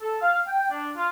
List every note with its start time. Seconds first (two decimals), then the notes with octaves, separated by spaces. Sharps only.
0.02 A4
0.21 F5
0.47 G5
0.71 D4
0.96 F4